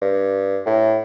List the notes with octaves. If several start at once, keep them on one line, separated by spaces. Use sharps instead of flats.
G2
A2